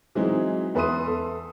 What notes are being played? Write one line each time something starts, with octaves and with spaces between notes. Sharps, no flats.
E3 F#3 G#3 C4 D#4 E4
E2 B4 E5 C6 D#6 D#7
A4